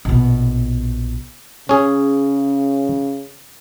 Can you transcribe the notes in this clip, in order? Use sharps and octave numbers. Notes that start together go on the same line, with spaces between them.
A#1 B2
C#3 C#4 G#4